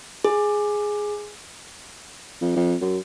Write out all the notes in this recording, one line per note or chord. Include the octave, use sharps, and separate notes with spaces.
G#4
F2
F2
F#2